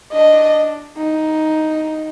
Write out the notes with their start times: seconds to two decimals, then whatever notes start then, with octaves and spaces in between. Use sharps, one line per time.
0.13 D4 D#5
0.97 D#4